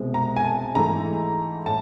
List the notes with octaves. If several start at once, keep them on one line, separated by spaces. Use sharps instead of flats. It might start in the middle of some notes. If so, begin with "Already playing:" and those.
Already playing: C2 B2 G#3 C4
A#5
G#5
A5
G#2 E3 A3 A#5
A2 A5